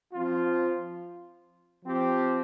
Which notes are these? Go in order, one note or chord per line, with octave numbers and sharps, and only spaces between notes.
F3 C4 F4
F3 C4 G4